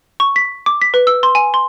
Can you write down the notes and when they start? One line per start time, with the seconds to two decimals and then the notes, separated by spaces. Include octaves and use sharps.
0.20 C#6
0.36 B6
0.66 D6
0.82 B6
0.94 B4
1.07 E6
1.23 C6
1.35 G#5
1.54 C6